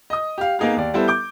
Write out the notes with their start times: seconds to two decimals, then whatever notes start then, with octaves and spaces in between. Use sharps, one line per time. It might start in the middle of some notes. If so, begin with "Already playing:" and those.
0.10 D#5 D#6
0.38 G4 F5
0.59 A#3 B3 D#4 G#4 F5
0.76 D#2 D5
0.94 G3 B3 E4 A4 C5
1.08 D6 G6